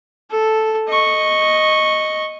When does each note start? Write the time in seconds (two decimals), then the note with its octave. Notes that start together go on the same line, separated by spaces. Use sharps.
0.31 A4
0.88 D#5 C#6